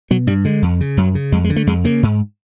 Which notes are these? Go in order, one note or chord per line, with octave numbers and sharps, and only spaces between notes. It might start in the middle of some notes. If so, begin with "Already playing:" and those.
B2 F#3
G2 G3
D3 G#3
F2
C#3
F#2 F#3
C#3
F2 G#3
G#3
D3
A3
F2 G#3
C#3 A#3
G#2